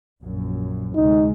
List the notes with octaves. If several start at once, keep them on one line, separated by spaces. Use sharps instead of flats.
A#1 F#2
D2 C3 G#3 D#4